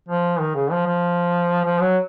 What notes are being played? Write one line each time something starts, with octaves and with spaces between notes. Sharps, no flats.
F3
D#3
C#3
F3
F3
F3
F#3